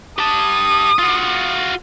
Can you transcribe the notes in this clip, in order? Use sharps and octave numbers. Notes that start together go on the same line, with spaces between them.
G4 A5 D#6
F4 F#4